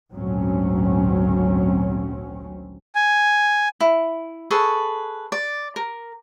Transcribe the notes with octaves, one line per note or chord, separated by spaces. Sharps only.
G#1 D2 A#2 F#3 C4 C#4
G#5
E4
G#4 A4 B4 C#6
D5
A#4